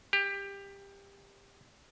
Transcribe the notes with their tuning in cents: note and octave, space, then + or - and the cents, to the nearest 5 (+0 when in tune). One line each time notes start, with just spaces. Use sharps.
G4 +20